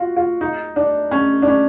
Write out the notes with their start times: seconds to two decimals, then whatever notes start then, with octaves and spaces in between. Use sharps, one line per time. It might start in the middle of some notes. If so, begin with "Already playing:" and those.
Already playing: F4 F#4
0.16 F4
0.41 D#4
0.76 D4
1.11 C#4
1.42 D4
1.47 C#4